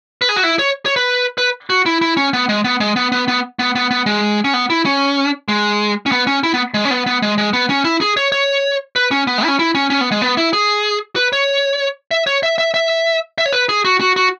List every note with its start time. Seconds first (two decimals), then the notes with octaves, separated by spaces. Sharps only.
0.22 B4
0.29 G#4
0.36 F#4
0.44 E4
0.59 C#5
0.86 C#5
0.96 B4
1.38 B4
1.70 F#4
1.86 E4
2.01 E4
2.17 C#4
2.33 B3
2.49 G#3
2.64 B3
2.80 G#3
2.96 B3
3.12 B3
3.28 B3
3.59 B3
3.75 B3
3.91 B3
4.06 G#3
4.44 C#4
4.54 B3
4.70 E4
4.85 C#4
5.48 G#3
6.06 C#4
6.12 B3
6.27 C#4
6.43 E4
6.54 B3
6.74 G#3
6.85 C#4
6.91 B3
7.06 B3
7.22 G#3
7.38 G#3
7.53 B3
7.70 C#4
7.85 E4
8.01 G#4
8.17 C#5
8.32 C#5
8.96 B4
9.11 C#4
9.27 B3
9.38 G#3
9.44 E4
9.48 C#4
9.59 E4
9.75 C#4
9.90 C#4
10.01 B3
10.11 G#3
10.22 B3
10.37 E4
10.53 G#4
11.16 B4
11.33 C#5
12.11 E5
12.27 C#5
12.43 E5
12.58 E5
12.74 E5
13.38 E5
13.46 C#5
13.53 B4
13.69 G#4
13.85 F#4
14.00 F#4
14.16 F#4